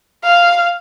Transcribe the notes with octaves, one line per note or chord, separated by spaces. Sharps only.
F5